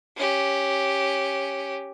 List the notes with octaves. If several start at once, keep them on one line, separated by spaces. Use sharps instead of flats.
C#4 G4